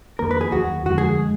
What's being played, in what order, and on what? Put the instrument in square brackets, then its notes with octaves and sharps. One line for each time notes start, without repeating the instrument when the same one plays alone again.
[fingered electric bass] F2 D#3 A#3 D4 [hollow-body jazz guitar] A#4
[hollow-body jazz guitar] B4
G#4
[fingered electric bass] D#2 D#3 F#3 [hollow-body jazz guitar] F#4
[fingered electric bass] F2 D3 F3 G#3 [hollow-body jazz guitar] F#4
[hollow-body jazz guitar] G#4
[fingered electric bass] G#3